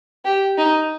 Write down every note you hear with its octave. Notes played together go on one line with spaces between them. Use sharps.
G4
D#4